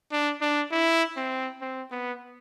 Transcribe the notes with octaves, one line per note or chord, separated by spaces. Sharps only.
D4
D4
E4
C4
C4
B3